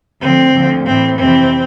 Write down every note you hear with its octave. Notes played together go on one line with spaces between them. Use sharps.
D2 D3 F3 C4
D2 D3 F3
A2 E3 C4
F2 C3 E3 C4